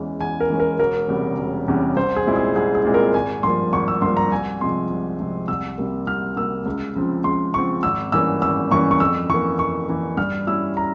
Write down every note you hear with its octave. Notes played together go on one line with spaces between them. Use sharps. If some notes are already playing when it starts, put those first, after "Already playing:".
Already playing: E2 E3 G#3 C#4
E2 G#5
A#4
E3 G#3 C#4
A#4
E1 A#4
E2 C3 G3 C#4
E1
E2 C3 G3 C#4
C2 C5
G#4
A#2 G#3 C4 E4
G#4
C2 G#4
G#4
A#2 G#3 C4 E4
A#4
G#1 G#5
G2 F3 A#3 C6
G#1 C#6
E6
G2 F3 A#3 C6
A#5
C2 G#5
C3 F3 G#3 C4 C6
C2
C3 F3 G#3 C4
C2 E6
C3 G3 A#3
C2 F6
C3 G3 A#3 E6
C#2
C#3 F3 C4
C#2 C6
C#3 F3 C4 C#6
G#1 E6
G2 E3 A#3 C#4 E6
G#1 E6
G2 E3 A#3 C#4 C#6
C#6
F2 E6
E3 A#3 C#6
F2 C#6
E3 A#3
G2 F6
G3 C#4 E4 E6
A#5